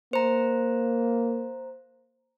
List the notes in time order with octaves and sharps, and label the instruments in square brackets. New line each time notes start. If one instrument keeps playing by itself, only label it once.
[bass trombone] A#3 [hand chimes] C5 A#5